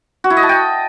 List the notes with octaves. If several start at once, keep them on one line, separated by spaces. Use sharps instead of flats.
F#4
E4
D#5
A5
G5